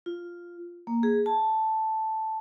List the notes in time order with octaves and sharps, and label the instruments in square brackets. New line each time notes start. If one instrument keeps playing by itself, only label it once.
[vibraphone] F4
A#3
G#4
A5